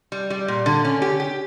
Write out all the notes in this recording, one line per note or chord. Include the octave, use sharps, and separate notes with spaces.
G3
G3
A#2
D3
C#4
G4
G4